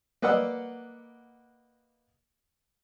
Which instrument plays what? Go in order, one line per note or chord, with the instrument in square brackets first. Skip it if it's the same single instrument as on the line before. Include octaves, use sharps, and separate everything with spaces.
[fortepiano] A#3 B4 D5 D#5 F#5 E6